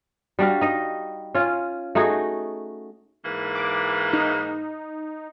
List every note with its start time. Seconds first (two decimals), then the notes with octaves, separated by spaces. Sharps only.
0.39 G3 D4 F#4 F5
0.61 D#4 D#5
1.35 C#4 F4
1.95 A3 D#4 F#4 G#4
3.25 G#2 E3 A#3
3.55 D6
4.13 D#4